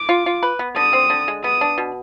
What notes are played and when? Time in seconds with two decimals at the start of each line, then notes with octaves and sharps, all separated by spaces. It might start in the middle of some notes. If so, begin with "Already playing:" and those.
Already playing: D6
0.09 F4
0.26 F4
0.43 B4
0.59 B3
0.76 D3 D#6
0.93 C4
1.10 D3
1.28 G#3
1.44 B3 D#6
1.61 D4
1.78 B2